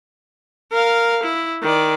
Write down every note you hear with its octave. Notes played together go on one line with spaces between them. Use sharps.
A#4 F5
E4
D#3 D5